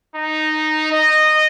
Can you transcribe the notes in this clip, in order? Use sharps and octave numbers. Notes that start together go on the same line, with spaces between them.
D#4
D#5